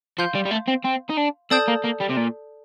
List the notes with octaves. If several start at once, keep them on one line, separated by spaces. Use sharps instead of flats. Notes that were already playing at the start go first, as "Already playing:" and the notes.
F3 F5 C6 G6
G3
G3
A3
C4
C4
D#4
D4
C4 A4 D5 A5 D#6 G6
A#3
A#3
G3
C3
A#2